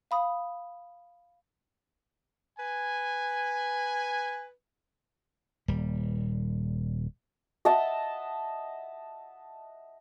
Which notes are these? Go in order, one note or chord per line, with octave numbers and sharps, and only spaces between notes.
F5 B5 D#6
B4 G#5
D#1 G3
D#5 E5 F#5 A5